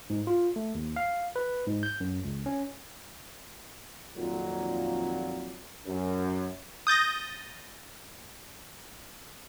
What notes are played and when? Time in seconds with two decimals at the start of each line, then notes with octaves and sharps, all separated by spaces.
0.10 G#2
0.27 F4
0.56 A3
0.75 D#2
0.96 F5
1.36 B4
1.67 G#2
1.83 G6
2.00 F#2
2.24 C#2
2.46 C#4
4.16 F2 A#2 D#3 F#3
5.86 F#2
6.87 D#6 G6 A6 A#6